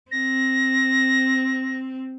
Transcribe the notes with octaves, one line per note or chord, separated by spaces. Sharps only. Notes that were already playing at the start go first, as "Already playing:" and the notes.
C4 A#6